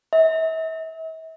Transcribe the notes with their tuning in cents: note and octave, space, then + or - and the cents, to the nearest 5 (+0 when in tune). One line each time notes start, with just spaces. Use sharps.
E5 -40